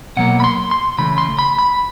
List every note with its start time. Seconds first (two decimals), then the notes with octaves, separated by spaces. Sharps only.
0.17 B2 F#3 A#3 F#5
0.40 B5
0.44 C6
0.71 C6
0.98 C#3 E3 A3 B5
1.18 C6
1.39 B5
1.59 B5